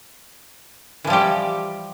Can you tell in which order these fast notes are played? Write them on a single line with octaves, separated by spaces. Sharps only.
E3 F3 G3 G4